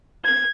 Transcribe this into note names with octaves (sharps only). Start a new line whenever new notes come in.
G#6